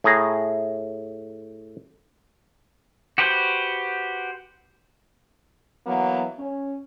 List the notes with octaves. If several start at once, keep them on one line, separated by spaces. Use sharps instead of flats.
A2 G#4 A#5
F#4 G4 B4 C5
E3 F#3 A#3 B3
C#4